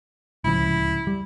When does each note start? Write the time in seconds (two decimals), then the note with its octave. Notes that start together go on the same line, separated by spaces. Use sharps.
0.44 D1 C#2 F3 E4
1.07 G3